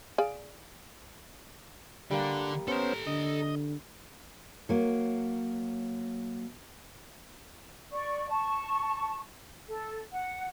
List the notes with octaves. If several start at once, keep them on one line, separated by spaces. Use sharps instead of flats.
G#4 D5 F5
D3 G3 A#3 D4
B3 C#4 A4 C5 A#5
D3 D#5
F#3 A#3
D5 C#6
A5 C#6
A4
F#5